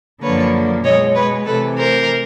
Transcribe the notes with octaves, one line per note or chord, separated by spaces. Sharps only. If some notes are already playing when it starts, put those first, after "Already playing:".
F#2 D3 F3 A#3 B4 C#5
B2 G#3 C#5 D#5
B4 C#5
C3 E3 A3 A4 B4
A#4 C5